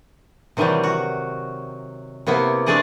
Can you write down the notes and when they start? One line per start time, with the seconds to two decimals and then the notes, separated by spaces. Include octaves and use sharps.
0.57 C3 D#3 E3 F#3 G3
0.83 F#4
2.27 C3 A#3 B3 E4
2.66 G#3 A3 D4 G#4 D5 D#5